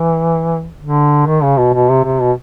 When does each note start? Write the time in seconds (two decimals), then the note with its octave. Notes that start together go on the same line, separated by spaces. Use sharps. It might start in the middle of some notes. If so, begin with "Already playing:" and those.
Already playing: E3
0.81 D3
1.27 D#3
1.43 C#3
1.58 B2
1.74 B2
1.89 C3
2.05 C3
2.21 B2